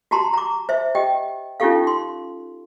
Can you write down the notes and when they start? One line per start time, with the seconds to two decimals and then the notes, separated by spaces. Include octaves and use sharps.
0.11 F#4 G4 A5 A#5 C6
0.34 A#5 D6
0.69 C5 E5
0.95 G4 D#5 G5
1.60 C#4 D#4 F4 G4 A4 F5
1.87 C6